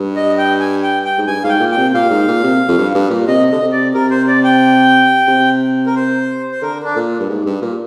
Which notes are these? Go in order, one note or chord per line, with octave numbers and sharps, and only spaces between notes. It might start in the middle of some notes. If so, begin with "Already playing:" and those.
Already playing: G2
D#5
G5
G#5
G5
G5
G#2
G2 G#5
G#2 F5
G5
A#2
G5
C3
A#2 F5
G#2
A#2
C3
F2
G2
G2
A#2
C3 D#5
D3 D#5
C3
D5
C3 A#4
C5
D5
G5
C3
A#4
C5
C5
D3 A#4
D4
A#2
G2
G#2
G2
A#2